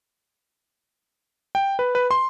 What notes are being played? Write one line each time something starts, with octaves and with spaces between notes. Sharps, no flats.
G5
B4
B4
C6